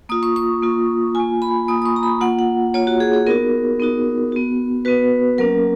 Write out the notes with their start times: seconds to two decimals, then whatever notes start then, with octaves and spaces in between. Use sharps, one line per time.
0.09 A#3 F4 D#6
0.23 C#6
0.36 C#6
0.63 A#3 F4
1.15 A#3 F4 G#5
1.42 B5
1.68 A#3 F4 D#6
1.82 D#6
1.85 C#6
1.96 A#5
2.03 B5
2.21 A#3 F4 F#5
2.39 F#5
2.74 A#3 F4 C#5
2.87 F#4
3.00 G#4
3.13 G#4
3.26 B3 D#4 F#4 A#4
3.80 B3 D#4 F#4
4.32 B3 F#4
4.85 B3 F#4 B4
5.38 F#3 A#3 C#4 A#4